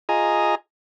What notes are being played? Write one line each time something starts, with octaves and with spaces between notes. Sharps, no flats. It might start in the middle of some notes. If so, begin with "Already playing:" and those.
F4 G#4 D#5 G#5 A#5